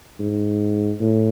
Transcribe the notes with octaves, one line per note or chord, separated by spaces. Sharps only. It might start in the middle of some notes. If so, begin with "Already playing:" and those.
G#2
A2